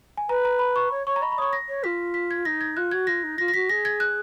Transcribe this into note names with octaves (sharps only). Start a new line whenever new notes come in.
G#5
B4 A#5
A#5
B5
C#6
C#5
C#5 C#6
A#5
D#5 B5
B5
C#5 C#6 D#6
A#6
C#5
F4 B6
B6
G#6
D#4 A#6
G#6
F4 F#6
F#4 G#6
F4 A#6
D#4
F4 A#6
A#6
F#4 B6
G#4 A#6
G#6
F#6